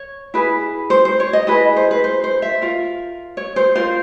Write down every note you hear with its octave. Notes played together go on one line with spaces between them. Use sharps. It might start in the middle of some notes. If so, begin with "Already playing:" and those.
Already playing: C#5
E4 G#4 B4
C5
C5
C#5
D#5
E4 G#4 B4 D#5
C5
B4
C5
C5
E5
F4 A#4
C#5
C5
F4 A#4 C5